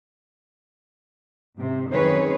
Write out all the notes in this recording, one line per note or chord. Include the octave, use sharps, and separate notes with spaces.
G#2 C3
F#2 D#3 C4 G#4 B4 C#5